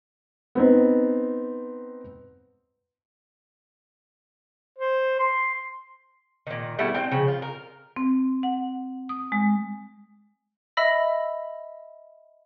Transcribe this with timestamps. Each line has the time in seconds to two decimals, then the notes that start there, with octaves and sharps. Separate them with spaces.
0.55 B3 C4 D#4
4.78 C5
5.19 C6
6.47 A#2 D#3
6.79 G3 A3 B3 E4
6.94 C4 D4 G5
7.11 C#3 F3
7.28 F4
7.42 A#4
7.96 C4
8.43 F#5
9.09 D#6
9.32 G#3
10.77 D#5 E5 B5 E6 A#6